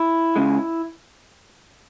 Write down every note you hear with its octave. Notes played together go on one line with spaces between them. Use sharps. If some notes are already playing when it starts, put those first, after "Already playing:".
Already playing: E4
C#2 C#3 G#3